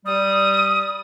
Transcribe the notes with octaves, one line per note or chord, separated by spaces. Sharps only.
G3 D#6